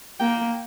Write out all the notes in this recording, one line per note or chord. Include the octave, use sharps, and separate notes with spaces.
A#3 G5